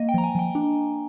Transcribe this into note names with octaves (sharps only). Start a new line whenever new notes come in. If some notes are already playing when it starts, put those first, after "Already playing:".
Already playing: A#3 D#5
G5
F3 A#5
G#5
F3 G5
D4